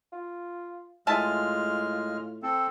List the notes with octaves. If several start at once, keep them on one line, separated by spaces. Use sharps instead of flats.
F4
A2 G#3 F4 E5 G#5 A5 F6
C4 A4